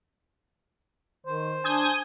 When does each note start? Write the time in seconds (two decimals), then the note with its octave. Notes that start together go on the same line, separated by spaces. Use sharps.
1.26 D#3 C5
1.64 D4 G#5 D#6 G6